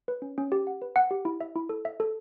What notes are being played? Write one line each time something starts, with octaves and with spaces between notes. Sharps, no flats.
B4
C#4
C#4
G4
F#5
B4
F#5
G4
E4
E5
E4
A4
E5
A4